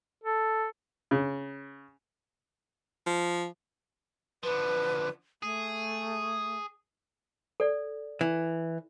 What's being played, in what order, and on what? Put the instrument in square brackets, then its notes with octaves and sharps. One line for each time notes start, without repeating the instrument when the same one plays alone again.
[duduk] A4
[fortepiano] C#3
[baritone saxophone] F3
[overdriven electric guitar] D3 F3 [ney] B4
[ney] A3 [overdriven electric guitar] G#4
[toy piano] A4 D5
[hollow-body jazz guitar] E3